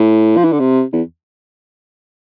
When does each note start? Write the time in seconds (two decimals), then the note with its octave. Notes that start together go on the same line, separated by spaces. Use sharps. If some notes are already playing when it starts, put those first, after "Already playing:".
Already playing: A2
0.37 F3
0.44 E3
0.52 D3
0.60 C3
0.93 E2